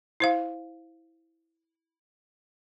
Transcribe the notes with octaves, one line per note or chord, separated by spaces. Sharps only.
E4 C5 F5